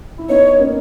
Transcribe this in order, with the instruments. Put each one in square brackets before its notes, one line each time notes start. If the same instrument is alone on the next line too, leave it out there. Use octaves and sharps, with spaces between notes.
[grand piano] E4
[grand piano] B3 D#4 [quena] C#5
[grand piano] A#3 C#4